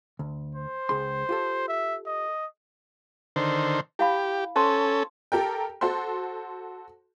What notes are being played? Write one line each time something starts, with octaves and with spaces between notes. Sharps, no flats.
D2
C5
C#2 G#4 C6
F4 G4 A4
E5
D#5
D3 D#3 C5
E4 G4 F5 B5
C#4 A4 C5 A5 C6
G4 A4 A#4 G5
F#4 A4 C5 C6